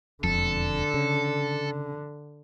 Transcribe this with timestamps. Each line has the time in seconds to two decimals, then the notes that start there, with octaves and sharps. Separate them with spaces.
0.24 E1 F2 D3 A4
0.94 C#3